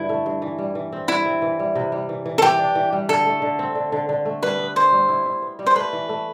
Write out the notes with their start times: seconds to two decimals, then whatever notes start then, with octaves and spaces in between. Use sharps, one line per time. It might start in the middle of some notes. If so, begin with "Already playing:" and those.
Already playing: G2 D3 E4
0.09 A3
0.26 G2
0.42 E3
0.59 G3
0.75 E3
0.92 C4
1.08 G3 E4
1.26 C4
1.42 E3
1.59 G3
1.75 C3
1.92 G3
2.09 E3
2.26 E3
2.38 A4
2.42 E3 G4
2.59 D4
2.75 E3
2.93 G3
3.09 D3 A4
3.25 A3
3.42 D3
3.59 C4
3.75 D3
3.92 D3
4.09 D3
4.25 A3
4.42 G3 B4
4.59 B3
4.76 B3 C5
4.92 G3
5.09 E4
5.26 E4
5.42 B3
5.59 G3
5.66 C5
5.76 A3 B4
5.93 E3
6.09 A3